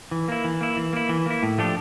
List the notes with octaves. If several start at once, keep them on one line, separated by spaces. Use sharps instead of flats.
E3
A#3 E4
E3
A#3 E4
E3
A#3 E4
E3
A#3 E4
A2
F3 A3 D4 G4